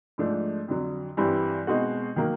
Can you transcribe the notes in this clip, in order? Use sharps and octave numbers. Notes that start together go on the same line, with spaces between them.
G#2 F3 A3 D4
F2 D3 F#3
G2 E3 G3 C4 E4
B2 G#3 C4 D#4 F#4
D#3 F#3 A#3